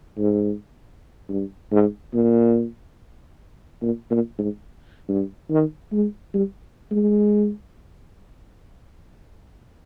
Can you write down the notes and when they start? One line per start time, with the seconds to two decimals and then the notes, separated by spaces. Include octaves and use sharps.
0.18 G#2
1.29 G2
1.72 G#2
2.14 A#2
3.82 A#2
4.11 A#2
4.39 G#2
5.09 G2
5.50 D#3
5.92 G#3
6.34 G3
6.91 G#3